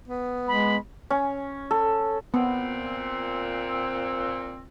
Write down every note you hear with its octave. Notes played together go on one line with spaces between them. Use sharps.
B3
G#3 B5
C#4
A4
A#2 B3 C4